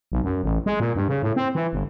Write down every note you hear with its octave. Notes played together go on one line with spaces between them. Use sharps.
B1
F#2
A1
G#3
A#2
G2
C#3
A2
C4
E3
G1